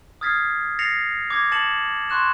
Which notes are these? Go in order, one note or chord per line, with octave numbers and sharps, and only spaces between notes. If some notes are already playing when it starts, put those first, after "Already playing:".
D#6 F6 G#6 A6 B6 C7
A6 A#6 C7 C#7 F7
D6 G#6 A#6
A5 A6 C#7 E7 F#7
C6 C#6 F#6 E7